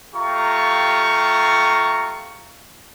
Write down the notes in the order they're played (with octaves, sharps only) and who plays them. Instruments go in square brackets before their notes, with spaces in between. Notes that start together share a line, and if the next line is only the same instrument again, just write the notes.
[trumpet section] A3 F4 G4 A#5 C#6